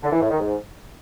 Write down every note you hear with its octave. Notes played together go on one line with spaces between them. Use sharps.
D3
E3
A2
D#3
G#2